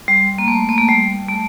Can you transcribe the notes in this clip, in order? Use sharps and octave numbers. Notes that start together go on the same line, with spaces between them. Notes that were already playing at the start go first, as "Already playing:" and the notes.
G3
A#3
A3
A#3
A3
G3
A3